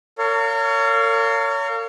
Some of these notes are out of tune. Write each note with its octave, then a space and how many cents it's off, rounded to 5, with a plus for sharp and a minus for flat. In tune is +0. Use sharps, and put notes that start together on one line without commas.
A#4 -40 C#5 +25 F5 +0